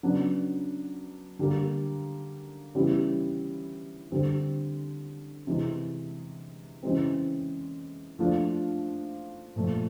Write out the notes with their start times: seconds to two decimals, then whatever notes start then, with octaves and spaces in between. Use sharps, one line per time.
0.03 C#3 F#3 B3 D4
1.39 D3 G3 A#3
2.75 C#3 E3 G3 B3 E4
4.12 D3 G3 C4
5.47 C3 E3 G#3
6.83 C#3 E3 G#3 C4
8.19 F3 A3 D4 F4
9.56 A#2 F3 A3